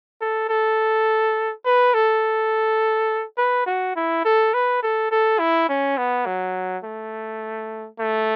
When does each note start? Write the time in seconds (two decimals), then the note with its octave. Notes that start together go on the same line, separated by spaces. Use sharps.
0.21 A4
0.49 A4
1.65 B4
1.94 A4
3.38 B4
3.66 F#4
3.96 E4
4.25 A4
4.54 B4
4.83 A4
5.11 A4
5.39 E4
5.69 C#4
5.97 B3
6.26 F#3
6.84 A3
7.99 A3